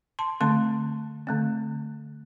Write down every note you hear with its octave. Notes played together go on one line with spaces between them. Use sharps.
A5 C6
D3 A3 C4 A5 C6
D3 A3 C4